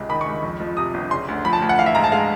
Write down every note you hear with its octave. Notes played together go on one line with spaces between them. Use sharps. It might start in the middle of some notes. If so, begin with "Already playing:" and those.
Already playing: G#1 C#2 C3
D#3 B5
C#6
C#2
F2
F3
C3 D#6
G1
C#3 C6
D2
F3 B5
A5
D2
F#5
E3 F5
E5
G#2 A#5
A5
G#3 F5